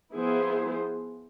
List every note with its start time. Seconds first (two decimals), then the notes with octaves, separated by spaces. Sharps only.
0.14 F3 B3 E4 G#4 C5